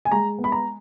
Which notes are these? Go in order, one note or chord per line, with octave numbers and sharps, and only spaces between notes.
G#5
G#3 A#5
B3
B5
A#5